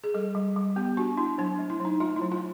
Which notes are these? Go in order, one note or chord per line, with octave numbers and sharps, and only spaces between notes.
G#4
G3 A4
G3
G3
B3 G4
D4 F#4
D4 E4
F#3 D4
A3
E4
F#3
D#4
A3 F4
E4
F#3
F4